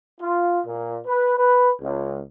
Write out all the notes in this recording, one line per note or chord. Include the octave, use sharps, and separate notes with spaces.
F4
A#2
B4
B4
C#2